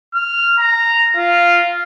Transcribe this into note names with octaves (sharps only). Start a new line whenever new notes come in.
F6
A#5
F4